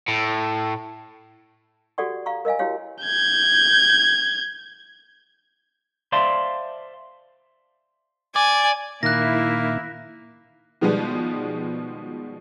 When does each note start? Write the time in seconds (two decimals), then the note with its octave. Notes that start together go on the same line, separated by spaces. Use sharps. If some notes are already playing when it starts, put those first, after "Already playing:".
0.08 A2
1.98 F#4 G4 A4 D5 F#5 C#6
2.26 F5 A#5 C#6
2.45 A#4 D#5 F5 G#5
2.59 E4 F#4 G4 C#5 F5
3.03 G6 G#6
6.12 C5 D5 E5 F5 A5 C6
8.36 D5 G#5
9.03 A#2 D#3 A#3 E4 E5 F#6 A#6
10.81 B2 D#3 F3 G3 G#3 B3